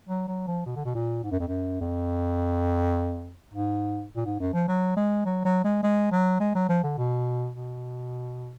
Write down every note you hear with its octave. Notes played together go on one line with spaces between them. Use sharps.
F#3
F#3
F3
B2
D3
B2
A#2
G#2
F#2
F2
F#2
F2
G#2
A#2
G#2
F#2
F3
F#3
G#3
F#3
F#3
G#3
G#3
F#3
G#3
F#3
F3
D3
B2
B2